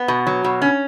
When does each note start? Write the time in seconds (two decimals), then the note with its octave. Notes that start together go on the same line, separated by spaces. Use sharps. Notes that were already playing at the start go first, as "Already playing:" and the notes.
Already playing: B3
0.08 B2
0.27 F#3
0.44 B2
0.62 C#4